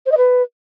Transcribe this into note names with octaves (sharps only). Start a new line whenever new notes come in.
C5
D#5
B4